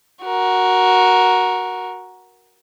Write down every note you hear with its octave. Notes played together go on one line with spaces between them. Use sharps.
F#4 A#4